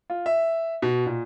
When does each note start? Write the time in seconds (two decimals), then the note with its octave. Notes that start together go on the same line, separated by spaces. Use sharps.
0.10 F4
0.26 E5
0.82 B2
1.06 A#2